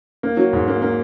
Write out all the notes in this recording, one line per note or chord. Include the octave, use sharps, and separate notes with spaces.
A#3
F#3
G#2
A#3
A#3